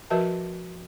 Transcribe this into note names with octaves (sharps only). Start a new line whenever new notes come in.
F3 F#4 A#4 B4 E5 A5